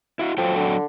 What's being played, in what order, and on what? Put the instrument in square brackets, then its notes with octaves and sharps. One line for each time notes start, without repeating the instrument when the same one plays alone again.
[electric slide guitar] E4 F#4
[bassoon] F3 [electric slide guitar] F#3 A4 G5
[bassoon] D3